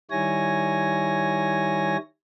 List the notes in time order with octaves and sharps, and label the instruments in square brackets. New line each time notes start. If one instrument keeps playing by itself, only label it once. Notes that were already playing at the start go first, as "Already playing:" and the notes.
[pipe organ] D#3 G3 E4 C#5 G#5 A#6